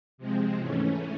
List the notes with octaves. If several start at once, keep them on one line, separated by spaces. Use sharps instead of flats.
C3 F3 G#3 C4
G#2 E3 A3 C#4